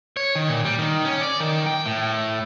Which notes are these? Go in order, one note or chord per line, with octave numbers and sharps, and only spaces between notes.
C#5
D#3
A#2
G3
D#3
C#4
D5
D#3
G5
A2